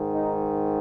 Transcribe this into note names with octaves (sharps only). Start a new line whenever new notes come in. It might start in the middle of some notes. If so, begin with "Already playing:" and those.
Already playing: G#2 D#3
D#4